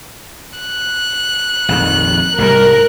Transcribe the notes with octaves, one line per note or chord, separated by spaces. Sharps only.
F#6
A#1 F2 D#3
C2 G#2 G3 A#4